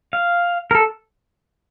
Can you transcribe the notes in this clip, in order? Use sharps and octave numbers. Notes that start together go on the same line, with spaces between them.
F5
A#4
A4